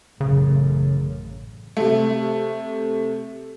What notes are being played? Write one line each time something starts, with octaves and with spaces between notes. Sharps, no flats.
A1 F#2 C#3
C3 A3